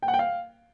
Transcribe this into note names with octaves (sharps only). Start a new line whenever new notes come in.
G5
F#5
G5
F5